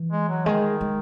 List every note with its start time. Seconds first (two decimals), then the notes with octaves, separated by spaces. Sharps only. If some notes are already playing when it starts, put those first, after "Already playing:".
Already playing: E3
0.12 G#3
0.29 F#3
0.46 D#3 G#3
0.81 G#3